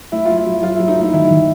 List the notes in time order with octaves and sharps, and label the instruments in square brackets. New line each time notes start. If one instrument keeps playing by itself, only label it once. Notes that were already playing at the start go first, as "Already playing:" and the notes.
[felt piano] A3 [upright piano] E4
[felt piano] F#3 [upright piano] F4
[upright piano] E4
[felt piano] F#3
[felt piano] F#3 [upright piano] F4
[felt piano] F#3 [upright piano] E4
[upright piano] D#4
[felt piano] A3 [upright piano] E4
[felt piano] D#3 [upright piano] E4
[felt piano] D#3